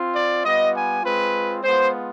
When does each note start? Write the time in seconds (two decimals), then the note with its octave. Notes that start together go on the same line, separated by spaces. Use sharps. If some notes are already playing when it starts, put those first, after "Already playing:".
Already playing: C4 F4
0.14 D5
0.44 G3 B3 F4 D#5
0.74 G#5
1.03 G#3 C4 F4 B4
1.63 G#3 B3 F4 C5